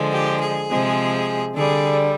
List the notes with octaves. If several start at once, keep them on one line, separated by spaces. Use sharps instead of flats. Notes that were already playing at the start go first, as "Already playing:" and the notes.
Already playing: D3 F3 G#3
G4
G#4
C3 F3 G#3
D3 G3 G#4